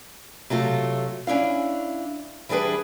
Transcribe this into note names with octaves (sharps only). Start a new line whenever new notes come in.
C3 F#3 A3 F4
C#4 D4 E4 F5
E3 G3 D4 G#4 B4